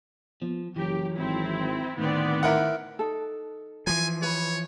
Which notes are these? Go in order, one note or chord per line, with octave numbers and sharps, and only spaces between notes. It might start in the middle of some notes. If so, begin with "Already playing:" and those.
F3 B3
F#1 E3 F#3 G4
G#1 C4 E4
D2 A2 D#3 B3 C4 D5
E4 A#4 F#5
D#4 A4
E3 F3 G#5
B4 C#5 B5